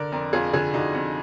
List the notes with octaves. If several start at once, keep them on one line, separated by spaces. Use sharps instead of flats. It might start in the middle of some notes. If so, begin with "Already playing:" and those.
Already playing: D3 A#4 D5
F2 A#4 D5
F2 F4 G#4
D3 F4 G#4
D3 D#4 F#4
F2